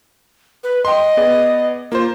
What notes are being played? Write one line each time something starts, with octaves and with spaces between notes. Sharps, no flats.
B4
D#5 G5 C6
B3 G#4 D5
A#3 F4 C5